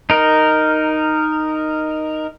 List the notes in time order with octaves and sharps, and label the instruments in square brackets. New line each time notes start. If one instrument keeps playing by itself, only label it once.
[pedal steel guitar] D#4 A#4